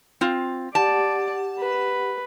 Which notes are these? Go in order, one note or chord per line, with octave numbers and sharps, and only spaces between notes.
C4 F4
G4 D5 F#5 A5
B4